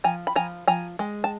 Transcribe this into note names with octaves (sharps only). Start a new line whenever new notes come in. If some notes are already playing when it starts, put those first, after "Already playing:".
F3 G#5 A#5
B5
F3 G#5 A#5
F3 G#5 A#5
G#3
A5